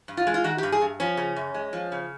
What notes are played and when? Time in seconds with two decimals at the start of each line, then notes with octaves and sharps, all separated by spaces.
0.08 G2
0.17 F4
0.27 G#3
0.34 F4
0.44 D#3 F#4
0.58 G2 G4
0.72 G#4
0.82 G2
1.00 F3 C#4
1.17 C#3
1.36 F#2
1.54 G#3
1.73 F3
1.92 C#3